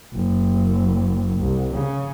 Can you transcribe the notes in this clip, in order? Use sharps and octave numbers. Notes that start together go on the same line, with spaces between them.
F#1
C2
C#3